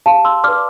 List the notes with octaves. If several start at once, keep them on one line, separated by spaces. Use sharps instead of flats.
G4 F5 A5
C6 E6
B4 D5 D6 F6